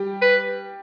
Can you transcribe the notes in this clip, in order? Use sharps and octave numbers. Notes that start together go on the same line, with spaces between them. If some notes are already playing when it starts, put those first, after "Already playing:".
Already playing: G3 G4
B4